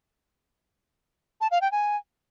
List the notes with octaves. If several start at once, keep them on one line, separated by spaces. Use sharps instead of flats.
A5
F5
G5
G#5